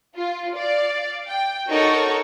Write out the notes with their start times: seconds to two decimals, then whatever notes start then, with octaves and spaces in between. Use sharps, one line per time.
0.16 F4
0.55 D5 F5
1.27 G5
1.69 D#4 F#4 A4 A#4 C#5 C#6